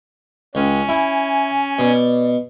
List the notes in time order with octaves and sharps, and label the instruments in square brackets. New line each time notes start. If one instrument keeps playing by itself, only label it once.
[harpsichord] C#2 [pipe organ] C#4 [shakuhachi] G5
[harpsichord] E4 [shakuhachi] G#5
[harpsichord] B2 [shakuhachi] D5